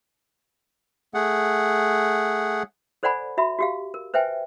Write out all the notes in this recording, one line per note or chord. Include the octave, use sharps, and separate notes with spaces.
A3 G#4 F#5
A4 C5 D5 F#5 G#5 B5
F#4 E5 B5
F#4 G4 F5
A#4
B4 C5 E5 G5 G#5